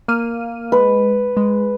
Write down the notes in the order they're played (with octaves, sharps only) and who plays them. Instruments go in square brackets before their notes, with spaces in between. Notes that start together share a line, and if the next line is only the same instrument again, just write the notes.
[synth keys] A#3 F6 D#7
[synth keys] G#3 [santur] B4
[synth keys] G#3